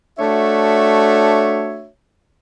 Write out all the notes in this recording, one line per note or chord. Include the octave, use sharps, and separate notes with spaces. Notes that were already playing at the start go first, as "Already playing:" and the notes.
A3 D4 F#4 C#5 E5